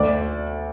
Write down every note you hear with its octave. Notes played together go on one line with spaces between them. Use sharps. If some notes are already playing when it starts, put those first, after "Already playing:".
Already playing: D2 D5